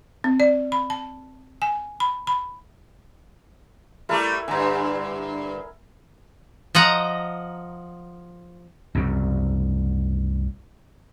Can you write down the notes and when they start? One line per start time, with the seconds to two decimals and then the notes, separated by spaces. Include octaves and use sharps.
0.24 C4
0.40 D5
0.72 B5
0.90 A5
1.62 G#5
2.00 B5
2.27 B5
4.09 G3 A3 E4 G4 A4 A#4
4.48 G2 D3 G#5 A#5
6.75 F3 D#5 F#5 A#5
8.95 C2 F#2 C#3